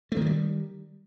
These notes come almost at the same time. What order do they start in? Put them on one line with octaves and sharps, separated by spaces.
A3 D#3 F#3 G3